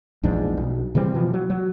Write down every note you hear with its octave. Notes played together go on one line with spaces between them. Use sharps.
A#1 E2 G#2 D4
B1
C#3 E3 G3 C4
B2 E3 F3
F#3
F#3